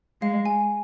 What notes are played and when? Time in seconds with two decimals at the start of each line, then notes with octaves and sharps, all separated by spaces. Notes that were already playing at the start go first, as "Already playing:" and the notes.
0.22 G#3 F5
0.45 G#5